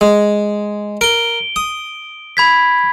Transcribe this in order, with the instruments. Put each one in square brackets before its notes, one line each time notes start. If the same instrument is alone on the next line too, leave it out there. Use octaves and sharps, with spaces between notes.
[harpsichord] G#3
[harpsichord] A#4 [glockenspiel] D7 G7
[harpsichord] D#6
[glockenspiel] B5 G#6 B6